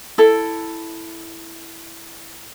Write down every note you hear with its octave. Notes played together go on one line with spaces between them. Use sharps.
E4 A4